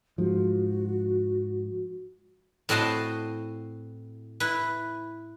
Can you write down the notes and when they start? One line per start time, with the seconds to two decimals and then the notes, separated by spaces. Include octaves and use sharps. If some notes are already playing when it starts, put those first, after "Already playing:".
0.18 G#2 F3 F#4
2.69 A2 C4 F#4 D#5 A5 C6
4.40 E4 B4